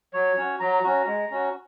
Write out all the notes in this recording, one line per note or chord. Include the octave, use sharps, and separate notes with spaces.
F#3 C#5
C#4 F#4
F#3 A#5
C#4 F#4
G#3
C#4 F#4